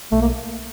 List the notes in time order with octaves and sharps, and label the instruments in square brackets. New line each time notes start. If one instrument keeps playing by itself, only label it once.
[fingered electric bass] B1 [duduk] A3
[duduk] A#3